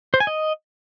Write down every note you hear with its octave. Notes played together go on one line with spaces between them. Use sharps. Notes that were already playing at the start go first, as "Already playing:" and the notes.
C5
G#5
D#5